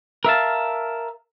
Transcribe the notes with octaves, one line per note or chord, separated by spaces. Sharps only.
A#4 E5 F5 A5